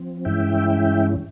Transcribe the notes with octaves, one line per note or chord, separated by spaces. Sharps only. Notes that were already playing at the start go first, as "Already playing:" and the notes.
Already playing: F3 C4
G2 E3 G#3 C#4 E4 E5 G5